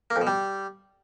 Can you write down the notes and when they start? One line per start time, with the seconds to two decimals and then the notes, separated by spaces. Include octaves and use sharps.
0.10 A#3
0.16 F2
0.21 B2
0.27 G3